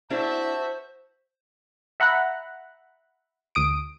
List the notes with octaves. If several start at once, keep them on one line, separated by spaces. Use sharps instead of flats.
D4 E4 F#4 G#4 C5 E5 A5
E5 F#5 A#5 B5 F#6
D2 D#6 D7